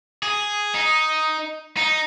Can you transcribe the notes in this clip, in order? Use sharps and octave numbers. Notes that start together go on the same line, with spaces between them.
G#4
D#4
D#4